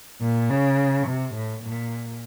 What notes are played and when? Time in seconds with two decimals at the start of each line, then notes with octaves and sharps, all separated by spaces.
0.21 A#2
0.49 C#3
1.07 C3
1.34 A2
1.64 A#2